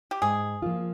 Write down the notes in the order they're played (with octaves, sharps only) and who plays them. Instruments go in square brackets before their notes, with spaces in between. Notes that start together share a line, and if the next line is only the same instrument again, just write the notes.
[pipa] G4
[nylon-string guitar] G#2 [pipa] G#4
[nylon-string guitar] F3 A#3 F4